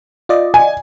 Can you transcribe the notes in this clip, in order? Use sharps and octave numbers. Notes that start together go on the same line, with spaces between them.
F4 D5 D#5
G#5